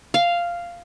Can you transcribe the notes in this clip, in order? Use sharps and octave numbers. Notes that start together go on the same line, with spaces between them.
F5